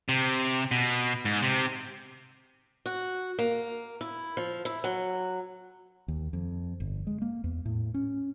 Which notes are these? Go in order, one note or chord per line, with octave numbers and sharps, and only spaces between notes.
C3
B2
G#2
C3
F#4
A#3
E4
F3
E4
F#3
D#2
F2
G1
G#3
A#3
E2
A2
C#4